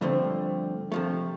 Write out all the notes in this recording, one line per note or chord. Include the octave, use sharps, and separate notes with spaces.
G2 D3 F3 A3 C4
C3 F3 A3